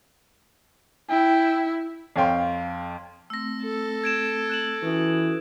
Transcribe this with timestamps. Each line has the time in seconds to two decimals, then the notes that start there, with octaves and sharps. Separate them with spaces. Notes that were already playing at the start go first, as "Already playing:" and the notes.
1.10 E4 G5
2.16 F2 C#5 F5 G5 C6
3.30 A3 C4 E6 A#6
3.62 A4
4.04 G#6 D7 E7
4.50 F#6 E7 F#7
4.83 E3 C#4 F#4 D#6